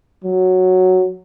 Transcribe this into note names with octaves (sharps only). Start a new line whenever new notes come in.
F#3